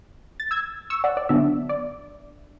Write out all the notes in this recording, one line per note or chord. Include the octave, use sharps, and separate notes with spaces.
A6
E6 G#6
C#6 E6
D5 F#5
D5
D3 F#3 B3 D4 E5
D5